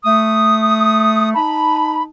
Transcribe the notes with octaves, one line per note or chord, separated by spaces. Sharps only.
A3 D#6
D#4 A5 B5